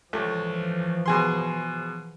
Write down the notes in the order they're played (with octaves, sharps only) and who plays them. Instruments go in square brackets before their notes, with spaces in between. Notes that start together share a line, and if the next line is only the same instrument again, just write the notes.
[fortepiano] C#2 A3 [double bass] E3 F3
[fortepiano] B2 G#4 C6